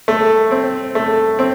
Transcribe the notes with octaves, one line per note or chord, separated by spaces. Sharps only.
A3
C4
A3
C4